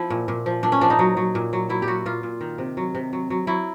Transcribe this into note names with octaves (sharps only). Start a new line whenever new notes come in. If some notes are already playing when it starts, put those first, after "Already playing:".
Already playing: F3 E4
A#2
A#2
F3
A#2 D4
C#4
F3 D4
D#4
F#3
F#3
A#2
F#3
F#3 E4
G4
F#3 F#4
A#2 F4
A#2
D#3
C3
F#3
C3
F#3
F#3
F#3 E4